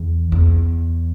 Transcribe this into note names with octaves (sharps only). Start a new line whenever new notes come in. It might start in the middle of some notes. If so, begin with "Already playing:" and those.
Already playing: E2
E2